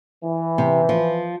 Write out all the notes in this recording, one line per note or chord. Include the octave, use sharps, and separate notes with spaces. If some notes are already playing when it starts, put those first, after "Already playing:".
E3
C3
F3